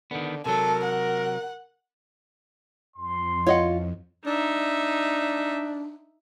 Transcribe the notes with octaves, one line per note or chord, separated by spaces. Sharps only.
D3 D#3 B3
C3 F#3 A4 A#4
F#5
F2 C6
F4 C#5 D#5 F#5
D4 D#4 E5